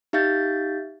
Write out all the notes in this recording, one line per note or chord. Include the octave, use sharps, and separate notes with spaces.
D#4 G4 E5 F5 G6 A6